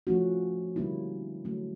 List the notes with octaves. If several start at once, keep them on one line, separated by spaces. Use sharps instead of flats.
F3 A3 C#4 F#4
D3 G3 A#3 C#4 E4
D3 F#3 A3 C#4